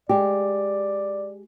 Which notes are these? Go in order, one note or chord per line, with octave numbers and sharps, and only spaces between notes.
G#3 G4 D5